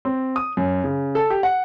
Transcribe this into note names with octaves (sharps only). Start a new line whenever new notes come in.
C4
D#6
F#2
C#3
A4
G4
F#5